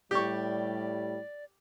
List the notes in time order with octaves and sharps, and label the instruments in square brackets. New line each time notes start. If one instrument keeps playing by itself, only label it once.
[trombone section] A2 G3 [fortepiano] G4 C#6 [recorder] D5